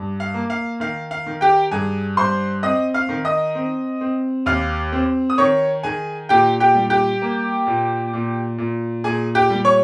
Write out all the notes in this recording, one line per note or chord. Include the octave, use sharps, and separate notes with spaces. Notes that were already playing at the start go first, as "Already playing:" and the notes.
Already playing: G2
F5
A#3
F5
D#3 F5
F5
D#3
G4 G5
G2 G#4 G#5
G2 C5 C6
C4 D#5 D#6
F5 F6
D#3
D#5 D#6
C4
C4
D#2 F5 F6
C4
D#6
D#3 C#5 C#6
D#3 G#4 G#5
A#2 G4 G5
G4 G5
G3
G4 G5
A#3
A#2
A#2
A#2
A#2 G#4 G#5
G4 G5
G3
C#5 C#6